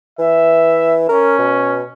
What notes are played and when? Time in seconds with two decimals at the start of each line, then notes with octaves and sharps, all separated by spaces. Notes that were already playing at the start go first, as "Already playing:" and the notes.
0.19 E3 E5
1.09 C#4 A#4
1.39 B2